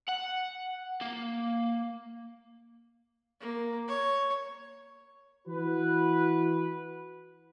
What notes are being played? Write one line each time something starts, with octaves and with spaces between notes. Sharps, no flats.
F#5
A#3
A#3
C#5
E3 F#4 B4